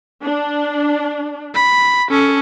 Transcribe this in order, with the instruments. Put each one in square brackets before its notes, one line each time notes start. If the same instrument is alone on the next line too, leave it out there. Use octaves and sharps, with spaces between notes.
[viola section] D4
[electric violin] B5
[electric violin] C#4 [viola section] A4